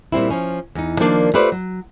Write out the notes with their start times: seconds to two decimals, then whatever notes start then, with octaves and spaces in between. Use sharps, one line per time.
0.12 A#2 G3 C4 E4
0.30 F3 C#4
0.75 E2 D#4
0.99 D#3 F3 A#3 D4 D5
1.34 A3 F4 G4 B4 C5 D5
1.52 F#3